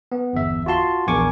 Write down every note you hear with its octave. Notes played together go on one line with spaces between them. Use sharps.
B3
G1 E2 E5
F4 F#4 A5 C6
A#1 E2 A#4 G#5 C#6 D6